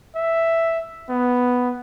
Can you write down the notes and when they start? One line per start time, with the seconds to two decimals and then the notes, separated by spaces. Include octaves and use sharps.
0.15 E5
1.10 B3